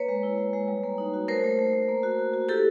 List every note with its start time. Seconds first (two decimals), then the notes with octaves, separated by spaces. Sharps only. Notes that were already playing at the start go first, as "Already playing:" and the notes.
Already playing: A#3 B4 C#5
0.08 G#3
0.23 E4
0.38 G#3
0.53 G#3
0.68 G3
0.84 A#3
0.98 D#4
1.14 F#4
1.28 A3 A#4 C5
1.44 A3
1.59 A3
1.73 A3
1.89 A#3
2.03 F#4
2.19 F#4
2.33 F#4
2.49 E4 G4 A4